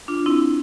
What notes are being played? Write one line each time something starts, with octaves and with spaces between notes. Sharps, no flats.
D4 F4
C4 E4